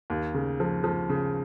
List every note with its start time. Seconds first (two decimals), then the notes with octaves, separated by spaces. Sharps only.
0.10 D#2
0.34 C#3
0.60 F3
0.84 F3
1.09 C#3